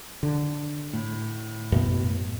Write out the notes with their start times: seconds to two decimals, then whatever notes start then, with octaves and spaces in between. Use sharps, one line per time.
0.23 D3
0.93 A2
1.72 F#2 B2 B3